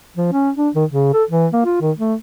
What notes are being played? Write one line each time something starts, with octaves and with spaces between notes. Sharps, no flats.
F3
C#4
D4
D#3
C#3
A4
E3
A#3
F4
D#3
A3